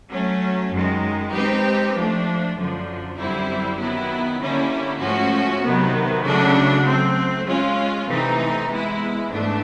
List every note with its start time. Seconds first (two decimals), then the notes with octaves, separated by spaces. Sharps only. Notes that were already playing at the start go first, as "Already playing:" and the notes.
0.10 F#3 A3 C#4
0.72 F#2 D#3 G#3
1.33 G#3 C4 D#4 G4 B4
1.94 F3 A3 D4
2.56 F#2 D3 F3
3.18 F#2 D3 G3 C4 E4
3.78 D#3 F#3 B3 E4
4.40 D3 G3 A#3 C#4 E4
5.00 G#2 F3 A3 C#4 F#4
5.62 C3 D#3 F#3 B3
6.23 C#3 F#3 A3 D4 F#4
6.85 F#3 A3 C4
7.45 G#3 C#4 F4
8.07 C3 E3 A3 C4 D#4
8.69 G#3 B3 E4
9.29 G#2 E3 A3 D4